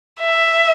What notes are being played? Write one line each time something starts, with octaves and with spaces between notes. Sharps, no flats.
E5